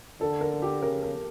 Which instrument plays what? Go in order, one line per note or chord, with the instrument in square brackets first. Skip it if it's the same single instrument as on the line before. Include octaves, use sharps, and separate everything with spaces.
[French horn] D3 [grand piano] A4
[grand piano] A#4
G4
[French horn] C#3 [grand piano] A#4
[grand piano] A#4